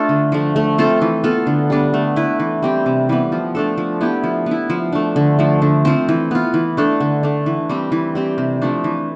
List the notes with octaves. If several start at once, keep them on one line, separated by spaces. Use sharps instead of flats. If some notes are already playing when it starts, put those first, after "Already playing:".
Already playing: A3 D4 F4 A4
D3
F3 A3
A3
C4 F4 A4
E3
B3 F4 A4
D3
G3 B3 D4
A3
E4 B4
E3
G3 C4 G4
C3
E3 G3 B3
F3
A3 D4 A4
F3
B3 E4 G4
F3
B3 E4
F3
A3 D4
D3
F3 A3
D3
F3 C4
E3
B3 F4
E3
A3 D4 A4
D3
A3 D4
E3
G3 C4 G4
E3
G3 C4 G4
C3
F3 A3 D4
E3